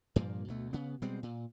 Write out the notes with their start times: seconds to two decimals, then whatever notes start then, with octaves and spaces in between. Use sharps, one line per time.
0.16 G2 A#2 F3 A#3
0.48 D2 B2 A3
0.73 C#3 B3
1.02 B2 G3 G#3 C4
1.23 A#2